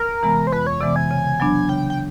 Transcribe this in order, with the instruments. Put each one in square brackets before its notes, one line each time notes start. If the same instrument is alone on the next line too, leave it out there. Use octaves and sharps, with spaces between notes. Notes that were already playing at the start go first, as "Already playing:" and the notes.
Already playing: [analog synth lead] A#4
[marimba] C3 E3 G#3 B3
[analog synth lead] C5
[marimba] F2 [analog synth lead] B4
[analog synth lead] C#5
[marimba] C3 E3 G#3 B3 [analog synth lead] D5
[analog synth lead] G#5
[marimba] C#3
F#3 B3 D4
[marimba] C#3 [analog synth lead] G5
[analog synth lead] G5